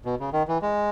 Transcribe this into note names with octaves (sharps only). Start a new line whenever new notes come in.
B2
C#3
D#3
E3
G#3